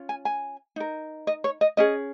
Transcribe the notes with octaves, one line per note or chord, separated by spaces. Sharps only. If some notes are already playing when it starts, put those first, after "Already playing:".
Already playing: C#4 F4
G#5
G#5
D#4 A#4
D#5
C#5
D#5
C#4 G#4 D#5